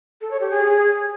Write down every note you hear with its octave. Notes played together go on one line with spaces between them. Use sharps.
A4
C#5
G4
G#4